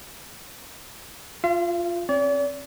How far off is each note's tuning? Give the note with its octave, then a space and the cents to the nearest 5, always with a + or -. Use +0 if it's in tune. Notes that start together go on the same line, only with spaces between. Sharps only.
F4 +0 F5 -45
C4 +40 D5 -45